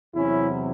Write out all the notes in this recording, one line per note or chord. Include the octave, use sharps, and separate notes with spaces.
E2 C3 F#3 C#4 E4